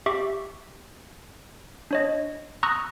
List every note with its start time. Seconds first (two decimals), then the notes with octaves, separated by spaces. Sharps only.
0.06 G4 E5 C#6 D6
1.91 D4 C#5 D#5
2.63 A#5 C#6 D#6 E6 F#6 A#6